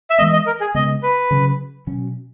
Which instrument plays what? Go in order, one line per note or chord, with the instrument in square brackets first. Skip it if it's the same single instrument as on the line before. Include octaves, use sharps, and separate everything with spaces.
[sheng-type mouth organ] E5
[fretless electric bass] E3 G#3 B3 [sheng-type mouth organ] D#5
[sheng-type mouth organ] D#5
A#4
G#4
[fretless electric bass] C#3 G#3 B3 [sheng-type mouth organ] D#5
[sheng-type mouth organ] B4
[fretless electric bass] C#3 F#3 C#4
B2 F#3 C#4